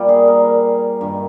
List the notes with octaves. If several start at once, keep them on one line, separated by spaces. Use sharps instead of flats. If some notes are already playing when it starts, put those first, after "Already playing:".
Already playing: A#2 G3
G#4
A#4
G2 D#3 G3